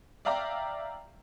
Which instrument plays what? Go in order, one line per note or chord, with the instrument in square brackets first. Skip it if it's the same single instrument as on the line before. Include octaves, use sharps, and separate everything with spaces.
[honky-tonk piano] D5 E5 F5 G5 A#5 D6